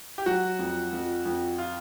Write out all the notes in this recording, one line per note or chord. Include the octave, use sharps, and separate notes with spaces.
G4
F#3 F#4
F2
F2
F2
F4